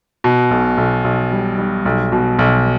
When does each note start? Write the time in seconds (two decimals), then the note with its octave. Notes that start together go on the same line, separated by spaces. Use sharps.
0.24 B2
0.51 B1
0.77 B1
1.04 B1
1.32 G3
1.58 G3
1.85 B1
2.12 B2
2.39 B1